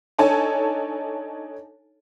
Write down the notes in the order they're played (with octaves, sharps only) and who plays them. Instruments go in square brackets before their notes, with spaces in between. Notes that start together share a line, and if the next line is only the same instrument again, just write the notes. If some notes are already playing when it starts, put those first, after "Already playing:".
[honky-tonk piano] D4 D#4 A4 C#5 G#5 A5